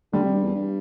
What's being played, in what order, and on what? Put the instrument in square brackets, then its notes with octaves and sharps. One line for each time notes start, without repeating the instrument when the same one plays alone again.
[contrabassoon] D3 [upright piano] G3
[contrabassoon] C3
G2
E2
G2